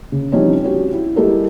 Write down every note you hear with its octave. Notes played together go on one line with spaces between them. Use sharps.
C#3
E3 F3 G3 C4 C#4 D#4
C#4 F#4 G4
E4
G3 G#3 E4 G4 A4 A#4